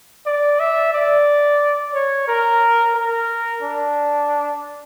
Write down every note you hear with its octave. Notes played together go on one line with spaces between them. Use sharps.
D5
E5
D5
C#5
A#4
A#4
D4